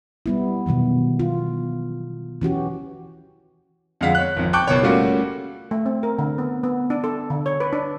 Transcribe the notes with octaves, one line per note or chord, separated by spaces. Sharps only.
G3 B3 E4
B2 D#3 E3 F#3
F4
E3 C#4 F#4 G4
F2 D3 G#3 F5 F#5 B6
C#5 F#6
G#1 F2
G5 A5 C#6 D6 F#6 G6
F#1 B2 C#5
G3 A3 A#3 C#4 F4 F#4
A3
C4
A#4
D3
B3
B3
D4
A4
D3
C#5
B4
D4